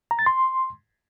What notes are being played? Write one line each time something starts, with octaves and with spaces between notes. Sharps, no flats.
A#5
A6
C6